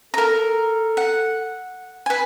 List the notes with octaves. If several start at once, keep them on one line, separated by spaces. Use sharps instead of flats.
A4 A#4 A#5
F#5
B4 G#5